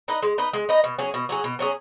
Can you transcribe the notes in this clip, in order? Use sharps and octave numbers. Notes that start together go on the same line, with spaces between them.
D#4 B4 D#5
G#3
D#4 B4 D#5
G#3
D#4 B4 D#5
B2
F#3 C#4 G#4
B2
F#3 C#4 G#4
B2
F#3 C#4 G#4